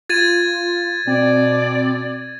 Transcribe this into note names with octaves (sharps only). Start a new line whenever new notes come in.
F4 G#6 A6 D#7
B2 C4 D5